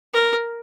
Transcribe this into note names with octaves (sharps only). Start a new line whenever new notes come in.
A#4